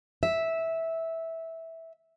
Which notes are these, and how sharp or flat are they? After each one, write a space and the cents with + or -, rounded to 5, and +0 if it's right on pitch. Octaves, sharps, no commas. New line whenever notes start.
E5 -10